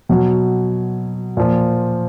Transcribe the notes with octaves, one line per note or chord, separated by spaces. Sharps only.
B2 F#3
A#2 F3